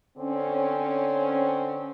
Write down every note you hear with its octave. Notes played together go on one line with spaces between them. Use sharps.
D3 C4 C#4